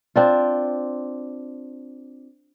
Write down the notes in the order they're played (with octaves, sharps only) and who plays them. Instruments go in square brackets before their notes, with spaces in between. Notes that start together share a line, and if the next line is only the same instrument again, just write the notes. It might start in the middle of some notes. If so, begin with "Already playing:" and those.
[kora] C4 D4 F4